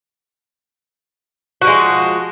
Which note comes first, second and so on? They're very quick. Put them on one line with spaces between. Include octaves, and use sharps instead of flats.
F#4 F3 G#3